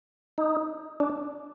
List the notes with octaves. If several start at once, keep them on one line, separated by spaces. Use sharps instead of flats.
D#4
D4